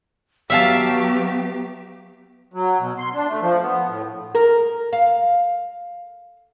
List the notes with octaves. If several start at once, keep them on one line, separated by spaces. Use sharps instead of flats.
F#3 B3 G4 E5 F5 A5
F#3
B2
C6
D4
A3
F3
B3
A2
A#4
F5